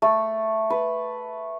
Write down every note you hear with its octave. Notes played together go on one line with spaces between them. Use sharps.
A3
B4